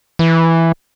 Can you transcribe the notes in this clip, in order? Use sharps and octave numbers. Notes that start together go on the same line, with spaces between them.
E3